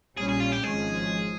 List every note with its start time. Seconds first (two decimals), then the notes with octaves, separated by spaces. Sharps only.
0.17 A#1 A#2 G3 C#4 G#4
0.29 G#4
0.40 F4
0.52 G4
0.63 G#1 G#2 F3 G#3 C#4 G#4